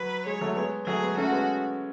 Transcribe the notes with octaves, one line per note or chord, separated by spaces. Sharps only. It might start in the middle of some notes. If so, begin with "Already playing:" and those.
Already playing: F#3 B4
G#3 C#5
F#3 A3
G#3 B3
F#3 A3 G#4
G#3 B3
A3 C#4 F#4
G#3 B3